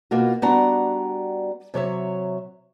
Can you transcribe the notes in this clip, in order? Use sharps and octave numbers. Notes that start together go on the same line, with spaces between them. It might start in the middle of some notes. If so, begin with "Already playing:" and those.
B2 A#3 F4 F#4
G3 B3 D4 F#4 F#5 A#5
C3 F#3 C#5 E5